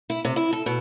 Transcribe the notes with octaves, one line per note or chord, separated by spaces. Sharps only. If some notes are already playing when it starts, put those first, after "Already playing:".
E4
C3
E4
A4
B2